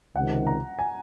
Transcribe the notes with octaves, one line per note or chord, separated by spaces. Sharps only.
C#2 C3 D#3 F#5
A#5
G#5